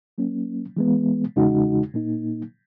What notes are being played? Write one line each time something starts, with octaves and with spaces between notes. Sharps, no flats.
F#3 A#3 C#4
E3 G#3 B3
E2 C#3 G#3 D#4 F#4
A#2 A#3 D#4